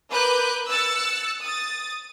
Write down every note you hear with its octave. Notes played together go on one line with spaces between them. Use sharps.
A#4 B4 D6 F#6 G6
E6 F#6 A6 C#7
D#6 A6